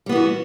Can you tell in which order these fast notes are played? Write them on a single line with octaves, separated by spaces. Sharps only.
G3 B3 E3 F#4